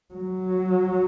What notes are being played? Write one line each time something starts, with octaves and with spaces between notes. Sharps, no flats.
F#3